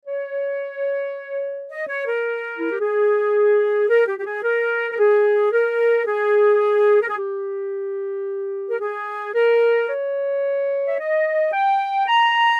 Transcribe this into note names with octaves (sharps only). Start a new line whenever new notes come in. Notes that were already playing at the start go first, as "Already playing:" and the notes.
C#5
D#5
C#5
A#4
E4
G4
G#4
A#4
G4
G4
G#4
A#4
A#4
G#4
A#4
G#4
A#4
G#4
G4
A#4
G#4
A#4
C#5
E5
D#5
G5
A#5